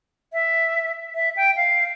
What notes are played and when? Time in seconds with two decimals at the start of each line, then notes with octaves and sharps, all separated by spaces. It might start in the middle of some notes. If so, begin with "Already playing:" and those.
0.33 E5
1.15 E5
1.37 G5
1.57 F5